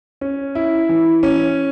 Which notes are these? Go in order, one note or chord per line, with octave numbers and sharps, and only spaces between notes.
C#4
E4
E3
C#4